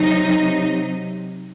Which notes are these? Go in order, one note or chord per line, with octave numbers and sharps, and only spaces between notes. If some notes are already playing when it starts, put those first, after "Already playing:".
Already playing: C3 F#3 D#4